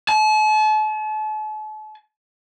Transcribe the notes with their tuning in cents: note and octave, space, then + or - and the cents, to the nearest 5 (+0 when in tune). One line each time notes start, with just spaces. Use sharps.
A5 -40